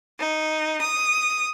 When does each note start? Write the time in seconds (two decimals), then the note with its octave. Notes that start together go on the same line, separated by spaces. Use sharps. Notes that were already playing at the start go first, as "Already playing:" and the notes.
0.20 D#4
0.81 D#6